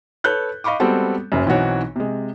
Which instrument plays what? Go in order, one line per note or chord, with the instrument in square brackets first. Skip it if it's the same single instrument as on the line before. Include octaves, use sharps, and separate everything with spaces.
[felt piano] A4 B4 C#5 F#6 G6
D#5 F5 B5 C#6 D6
G3 G#3 B3 C4 F#4 A4
F#1 F#2
B1 E3 C4 D#4 F#4 C#5
C3 G#3